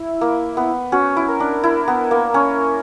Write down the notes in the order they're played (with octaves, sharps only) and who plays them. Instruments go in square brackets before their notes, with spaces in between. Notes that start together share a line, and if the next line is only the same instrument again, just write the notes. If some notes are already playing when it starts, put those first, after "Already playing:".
Already playing: [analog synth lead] E4
[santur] A#3
B3
[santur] C#4 [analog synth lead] F#4
[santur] E4
[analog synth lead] A#4
[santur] D4
E4
B3
A#3
C#4